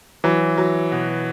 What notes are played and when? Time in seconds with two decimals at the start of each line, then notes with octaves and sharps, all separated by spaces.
0.24 E3 F#3
0.58 F#3
0.92 B2